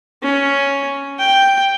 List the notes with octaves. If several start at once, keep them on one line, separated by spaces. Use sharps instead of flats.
C#4
G5